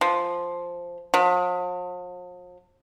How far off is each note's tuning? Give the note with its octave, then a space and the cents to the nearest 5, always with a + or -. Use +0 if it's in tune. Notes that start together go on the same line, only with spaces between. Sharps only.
F3 +0
F3 +45